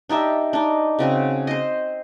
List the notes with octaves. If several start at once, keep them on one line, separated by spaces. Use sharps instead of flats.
D4 D#4 G4 E5
D4 D#4
C#3 C4 F#4
C5 D#5